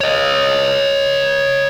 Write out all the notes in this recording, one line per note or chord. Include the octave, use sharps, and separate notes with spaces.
C#5 D#5